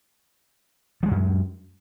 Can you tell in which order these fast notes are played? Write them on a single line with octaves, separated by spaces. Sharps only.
F3 G#3 F#3 F#2